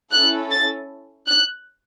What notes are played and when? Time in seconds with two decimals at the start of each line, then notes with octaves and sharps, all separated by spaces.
0.12 C#4 E4 A4 F#6
0.51 A6
1.28 F#6